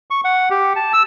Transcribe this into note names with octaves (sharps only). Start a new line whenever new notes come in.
C#6
F#5
G4
A5
E6